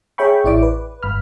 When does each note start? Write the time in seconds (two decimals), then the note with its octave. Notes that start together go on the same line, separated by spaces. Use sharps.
0.18 G#4 C#5 E5 G5 B5 C#6
0.44 A1 E4 D5 D6
0.63 B4
1.03 G1 B5 F6